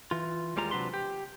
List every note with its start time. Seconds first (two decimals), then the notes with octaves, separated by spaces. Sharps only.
0.11 E3 F4
0.56 D#2 G3 G#3 F4 A#5
0.71 C3 F#3 D4 B4 C6
0.94 G4